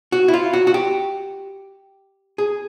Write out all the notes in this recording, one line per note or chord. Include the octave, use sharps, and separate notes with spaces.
F#4
E4
F4
F#4
F#4
G4
G#4